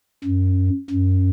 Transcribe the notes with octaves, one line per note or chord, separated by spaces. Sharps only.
F#2
F#2